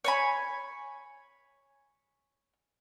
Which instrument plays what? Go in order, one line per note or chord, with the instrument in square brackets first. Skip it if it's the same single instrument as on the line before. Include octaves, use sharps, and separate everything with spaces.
[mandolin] C#5 G#5 B5